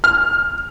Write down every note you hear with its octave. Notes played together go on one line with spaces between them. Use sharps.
F6